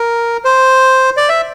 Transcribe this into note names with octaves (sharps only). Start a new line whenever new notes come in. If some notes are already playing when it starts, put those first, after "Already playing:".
Already playing: A#4
C5
D5
E5